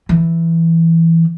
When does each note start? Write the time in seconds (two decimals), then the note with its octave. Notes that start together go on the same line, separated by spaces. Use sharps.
0.09 E3